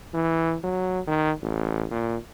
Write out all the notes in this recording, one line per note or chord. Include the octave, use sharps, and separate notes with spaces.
E3
F#3
D#3
A1
A#2